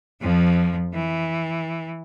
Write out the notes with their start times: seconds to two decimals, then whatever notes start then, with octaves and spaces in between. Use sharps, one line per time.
0.22 F2 F3
0.94 E3